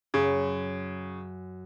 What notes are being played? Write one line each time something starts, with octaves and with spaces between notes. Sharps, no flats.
F#2 C#3